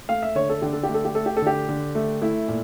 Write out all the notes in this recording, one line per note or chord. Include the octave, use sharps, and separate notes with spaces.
A3 F5
E5
D3 C#5
A4
D3 G4
A4
G4
A3
A4
G4
A3 A4
G4
A4
D3 G4
D3
A3
A3 E4
A#2